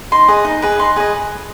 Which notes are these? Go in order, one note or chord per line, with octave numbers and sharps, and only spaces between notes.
D#4 C6
G#4 B4 D#5
D#4
G#4 B4 D#5
D#4 C6
G#4 B4 D#5